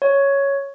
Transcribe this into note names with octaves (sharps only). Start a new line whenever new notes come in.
C#5